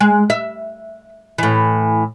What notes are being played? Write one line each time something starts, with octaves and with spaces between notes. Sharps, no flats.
G#3
E5
A2 E3